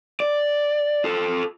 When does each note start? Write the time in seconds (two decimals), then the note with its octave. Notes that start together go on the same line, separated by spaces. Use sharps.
0.20 D5
1.04 F4 A4